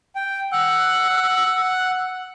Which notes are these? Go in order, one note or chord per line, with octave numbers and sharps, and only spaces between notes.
G5
F#5 E6 F#6